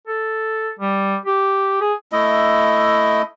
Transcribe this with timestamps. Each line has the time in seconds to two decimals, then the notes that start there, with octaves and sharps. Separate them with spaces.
0.07 A4
0.79 G3
1.26 G4
1.81 G#4
2.12 A3 E4 D#5